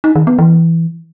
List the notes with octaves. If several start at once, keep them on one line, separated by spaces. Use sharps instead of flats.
D#4
D#3
B3
E3